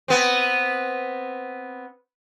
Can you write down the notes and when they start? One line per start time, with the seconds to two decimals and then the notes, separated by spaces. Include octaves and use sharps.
0.08 B3 C4